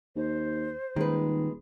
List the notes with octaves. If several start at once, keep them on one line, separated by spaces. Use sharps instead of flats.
D#2 C5
D#1 D#3 G#3 B4